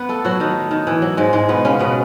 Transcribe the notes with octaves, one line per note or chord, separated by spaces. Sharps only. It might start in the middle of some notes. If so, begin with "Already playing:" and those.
Already playing: B3 B4
A3 A4
F#3 F#4
D#3 D#4
D#3
E3
F#3
G#2 G#3
G#2 G#3
B2 B3
C#3 C#4
B2 B3